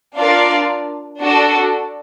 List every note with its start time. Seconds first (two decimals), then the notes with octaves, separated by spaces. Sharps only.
0.16 D4 F4 A#4 D5 F5
1.19 D4 F#4 A4